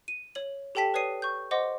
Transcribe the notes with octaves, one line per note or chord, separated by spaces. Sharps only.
D#7
C#5 F#7
G4 A4 G5 A5 B6 E7
B4 C#5 D5 D#6 C7 D#7
C#6 G6
C5 D#5 F#5 C6 D6 A#6